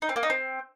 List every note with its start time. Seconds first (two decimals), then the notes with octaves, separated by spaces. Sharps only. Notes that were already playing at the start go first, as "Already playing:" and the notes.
0.02 D#4
0.09 C4
0.16 A#3
0.23 D#4
0.30 C4